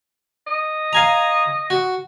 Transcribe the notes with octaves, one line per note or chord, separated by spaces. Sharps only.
D#5
F5 G#5 A#5
F#4